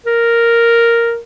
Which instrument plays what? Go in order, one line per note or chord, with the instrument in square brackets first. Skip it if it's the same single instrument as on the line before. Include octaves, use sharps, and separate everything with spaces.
[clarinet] A#4